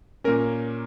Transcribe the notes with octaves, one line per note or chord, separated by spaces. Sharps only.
A#2 A#3 C#4 A#4